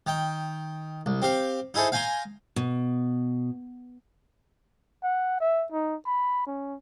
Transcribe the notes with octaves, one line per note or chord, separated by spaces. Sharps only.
D#3 G5
C2
C4 G4 F5
D#4 E4 G#4 A4 C5
F5 G5 G#5 A#5 C6
B2
F#5
E5
D#4
B5
C#4